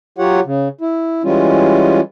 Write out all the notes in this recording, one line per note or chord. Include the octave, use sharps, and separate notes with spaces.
F#3 F4 G4 C#5 F#5
C#3
E4
E3 G3 G#3 C#4 F4